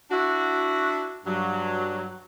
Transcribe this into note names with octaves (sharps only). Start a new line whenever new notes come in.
D4 E4 F#4
G2 F#3